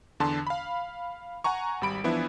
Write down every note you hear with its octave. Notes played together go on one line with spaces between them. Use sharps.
E2 D3 A5 C6
F5 B5
F#5 G#5 A#5 C#6
G#1 G3 B5 D7
E3 F3 B3 D4 E4